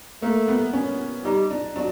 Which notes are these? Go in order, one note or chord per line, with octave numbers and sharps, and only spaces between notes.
A3 A#3
B3
C#4
G3 D#4
D4
F#3 D4